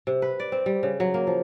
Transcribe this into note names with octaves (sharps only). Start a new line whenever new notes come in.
C3
B4
D5
C4
G3
C#3
F#3
A#3
F3